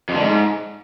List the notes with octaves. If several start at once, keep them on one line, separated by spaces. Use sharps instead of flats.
F2
D3
G#2